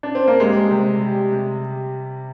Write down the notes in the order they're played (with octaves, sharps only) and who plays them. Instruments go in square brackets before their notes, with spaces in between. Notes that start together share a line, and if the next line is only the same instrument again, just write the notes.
[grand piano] D4
C4
A#3
[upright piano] G3 [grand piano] G#3
[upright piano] C3
G3
C3